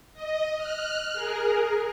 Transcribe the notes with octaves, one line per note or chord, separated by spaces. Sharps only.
D#5
F6 F#6
G#4 A#4